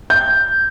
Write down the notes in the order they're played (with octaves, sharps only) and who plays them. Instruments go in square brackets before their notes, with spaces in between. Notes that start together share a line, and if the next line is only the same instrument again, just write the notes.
[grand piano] G6